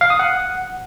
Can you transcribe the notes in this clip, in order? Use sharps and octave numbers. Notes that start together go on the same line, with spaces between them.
F5
D#6
F#5